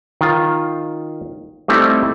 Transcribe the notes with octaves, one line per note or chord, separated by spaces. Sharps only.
D#3 F4
G3 A3 C4 D#4 E4